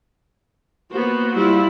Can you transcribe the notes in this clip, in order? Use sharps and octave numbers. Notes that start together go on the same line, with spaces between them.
A#3 B3 F#4 C5
G3 E4 F4